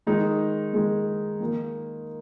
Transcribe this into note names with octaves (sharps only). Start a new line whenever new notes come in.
D#3 G#3 D#4
D#3 G#3 D#4
D#3 A#3 D#4